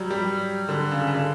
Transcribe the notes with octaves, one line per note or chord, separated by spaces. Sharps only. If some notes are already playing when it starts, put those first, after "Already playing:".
Already playing: F#3 G3
G3
D3
C#3
C#3
D3